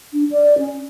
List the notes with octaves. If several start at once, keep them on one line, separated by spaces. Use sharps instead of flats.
D4
D5
C#4